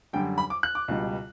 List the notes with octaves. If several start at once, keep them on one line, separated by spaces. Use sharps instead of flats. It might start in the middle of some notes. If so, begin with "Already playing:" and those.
F#2 D3 G3 G5
B5
D6
F#6
D6
C#2 B2 G3